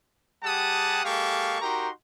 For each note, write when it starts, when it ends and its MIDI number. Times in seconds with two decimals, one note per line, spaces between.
0.43 1.04 55
0.43 1.04 67
0.43 1.04 68
0.43 1.04 78
0.43 1.04 81
0.43 1.04 87
1.05 1.60 56
1.05 1.60 58
1.05 1.60 67
1.05 1.60 69
1.05 1.60 77
1.05 1.60 85
1.62 1.89 63
1.62 1.89 66
1.62 1.89 67
1.62 1.89 70
1.62 1.89 82
1.62 1.89 84